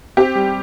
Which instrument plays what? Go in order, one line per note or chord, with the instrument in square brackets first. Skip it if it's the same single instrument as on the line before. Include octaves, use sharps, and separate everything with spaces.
[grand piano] C4 [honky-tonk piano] G4
[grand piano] G3